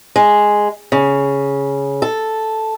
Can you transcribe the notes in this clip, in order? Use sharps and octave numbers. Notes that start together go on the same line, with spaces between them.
G#3
C#3
A4